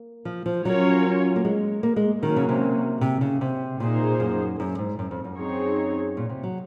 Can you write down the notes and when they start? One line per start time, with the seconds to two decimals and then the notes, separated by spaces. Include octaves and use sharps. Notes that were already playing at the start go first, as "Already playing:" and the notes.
Already playing: A#3
0.25 F3
0.46 F3
0.65 F#3 C#4 F4 A#4 C#5
1.36 A#3
1.45 G#3
1.83 A#3
1.96 G#3
2.23 D#3 F#3 A#3 C#4
2.36 C#3
2.49 C3
3.01 C3
3.21 C#3
3.41 C3
3.80 A#2 A#3 D#4 G#4 C5
4.20 F#2
4.60 F#2
4.79 G#2
4.99 F#2
5.11 F2
5.24 F#2
5.37 C4 D#4 G#4 C#5
6.17 A#2
6.29 C3
6.44 F#3